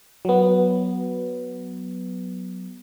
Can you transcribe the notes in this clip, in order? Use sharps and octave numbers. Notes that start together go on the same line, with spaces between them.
F#3 B3